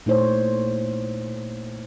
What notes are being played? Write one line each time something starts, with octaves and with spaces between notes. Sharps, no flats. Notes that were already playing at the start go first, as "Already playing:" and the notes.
A#2 A3 D#4 E4 C5 C#5